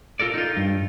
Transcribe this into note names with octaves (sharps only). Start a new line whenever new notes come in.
F4 A4 A#4 D5
D#4 F4
G2